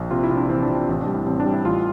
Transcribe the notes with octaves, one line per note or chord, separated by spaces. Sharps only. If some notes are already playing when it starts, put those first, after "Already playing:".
Already playing: A#1
C3 F4
E4
C3
D4
E3 C4
D4
C3
D4
A1
D4
G3
E4
A1 C4
D4
G3
E4
A1 F4